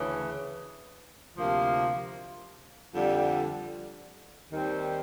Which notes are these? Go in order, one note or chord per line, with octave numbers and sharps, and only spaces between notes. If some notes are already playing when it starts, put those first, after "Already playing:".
Already playing: D2 C#3 E3
D2 C3 F3 A#3
F2 D3 G3
D#2 D#3 G3 C4